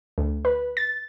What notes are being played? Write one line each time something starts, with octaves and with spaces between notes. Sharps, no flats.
D2
B4
A6